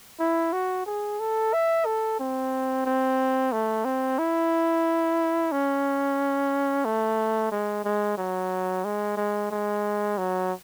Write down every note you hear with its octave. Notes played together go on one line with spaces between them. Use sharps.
E4
F#4
G#4
A4
E5
A4
C4
C4
A3
C4
E4
C#4
A3
G#3
G#3
F#3
G#3
G#3
G#3
F#3